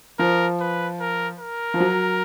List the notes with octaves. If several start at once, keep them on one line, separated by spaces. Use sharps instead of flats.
F3 A#4
B4
A#4
A#4
F3
F#3